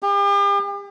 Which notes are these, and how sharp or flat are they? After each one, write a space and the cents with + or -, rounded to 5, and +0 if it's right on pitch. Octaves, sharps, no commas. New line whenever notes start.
G4 +40